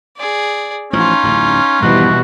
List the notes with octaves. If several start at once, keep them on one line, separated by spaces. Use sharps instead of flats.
G#4 D5
A1 F3 C#4 D#4 F4
D1 A1 E2
G#1 E2 B2 E3 F3 G3 F#4